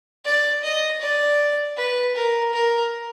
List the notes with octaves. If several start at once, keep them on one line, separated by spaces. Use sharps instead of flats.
D5
D#5
D5
B4
A#4
A#4